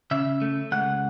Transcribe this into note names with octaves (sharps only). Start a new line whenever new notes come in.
C#3 E5
A3
C#2 F#5